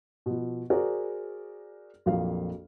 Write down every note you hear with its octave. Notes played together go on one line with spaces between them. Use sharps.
B2 F3
F#4 G#4 A#4 C5 D5
A#1 F2 F#3 A#3 F5